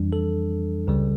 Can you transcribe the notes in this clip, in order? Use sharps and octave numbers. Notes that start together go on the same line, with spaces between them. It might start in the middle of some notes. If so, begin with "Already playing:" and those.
Already playing: F2 E3 G3 D4
A4
C#2 C#3 G3